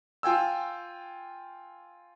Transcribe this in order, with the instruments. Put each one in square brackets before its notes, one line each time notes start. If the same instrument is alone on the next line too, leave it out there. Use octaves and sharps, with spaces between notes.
[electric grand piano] F4 G5 G#5 E6